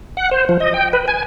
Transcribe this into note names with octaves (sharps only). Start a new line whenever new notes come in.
F#5
C5
F3
D#5
G5
B4
G#5